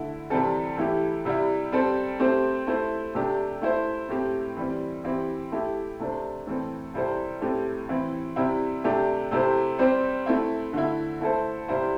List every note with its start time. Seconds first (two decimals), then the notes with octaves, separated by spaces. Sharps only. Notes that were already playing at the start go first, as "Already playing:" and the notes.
Already playing: D3 A3 E4
0.30 C3 E3 G3 C4 A4
0.77 E3 A3 E4 G4
1.25 C3 G3 E4
1.72 G3 C4 A4 C5
2.19 A3 C4 G4 C5
2.67 A3 E4 C5
3.14 C3 A3 D4 G4
3.62 A3 E4 C5
4.09 A2 A3 C4 G4
4.57 E3 G3 C4
5.04 E3 C4 E4 G4
5.52 A3 E4 G4
5.99 C3 A3 D4 C5
6.47 A2 E3 C4 A4
6.94 C3 G3 E4 A4 C5
7.41 A2 A3 C4 G4
7.89 E3 C4 E4
8.36 C3 G3 C4 E4
8.84 C3 A3 D4 G4
9.31 C3 A3 E4 G4 C5
9.79 G3 C4 G4 C5
10.26 A3 C4 E4
10.73 D3 A3 E4
11.21 A3 E4 A4 C5
11.68 C3 G3 E4 C5